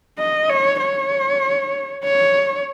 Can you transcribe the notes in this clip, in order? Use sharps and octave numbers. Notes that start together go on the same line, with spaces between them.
D#5
C#5
C#5
C#5